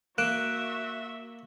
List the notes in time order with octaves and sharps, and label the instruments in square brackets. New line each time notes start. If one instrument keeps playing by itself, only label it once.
[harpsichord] A#3 [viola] F#4 E5 [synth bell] F#6 D7 E7